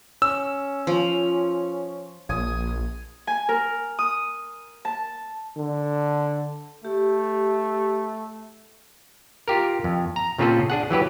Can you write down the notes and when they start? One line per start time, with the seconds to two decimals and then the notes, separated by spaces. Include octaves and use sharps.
0.22 C#4 E6
0.87 F3
2.29 A#1 G#5 D#6
3.27 G#5
3.49 A#4
3.99 D#6
4.85 A5
5.57 D3
6.85 A3 G4
9.48 F4 G4 A#4
9.84 F2
10.16 A#5
10.38 A#2 C#3 C4 F4 G#4 A4
10.70 D4 G#4 F#5
10.91 E3 F#3 G4 B4